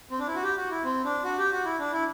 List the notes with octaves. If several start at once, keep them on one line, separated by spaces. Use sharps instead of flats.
C4
D4
E4
F#4
G4
F#4
E4
C4
D4
F#4
G4
F#4
E4
D4
E4